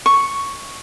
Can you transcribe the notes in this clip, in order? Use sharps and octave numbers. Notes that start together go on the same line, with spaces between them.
C#6